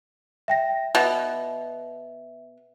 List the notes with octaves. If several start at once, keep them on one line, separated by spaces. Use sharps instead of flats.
E5 G5 A#6
B2 E5